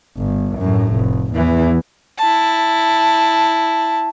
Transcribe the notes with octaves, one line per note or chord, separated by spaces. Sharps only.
G1
F#2 A2
F1
E2 E3
E4 A5